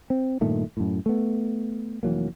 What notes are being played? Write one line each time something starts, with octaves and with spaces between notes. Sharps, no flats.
C4
G2 A#2 D#3 A3
F#2 A2
A3 B3
F1 E3 F#3 A#3